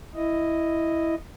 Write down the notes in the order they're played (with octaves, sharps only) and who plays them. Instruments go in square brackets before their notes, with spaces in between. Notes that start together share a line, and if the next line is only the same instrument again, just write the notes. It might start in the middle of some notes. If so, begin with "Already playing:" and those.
[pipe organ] E4 D#5